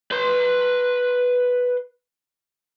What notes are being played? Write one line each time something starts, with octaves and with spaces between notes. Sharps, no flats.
B4 C6